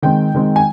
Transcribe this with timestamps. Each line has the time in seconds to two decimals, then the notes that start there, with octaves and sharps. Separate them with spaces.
0.02 D#3 G#3 C4 G5
0.35 D#3 G#3 C4
0.56 G#5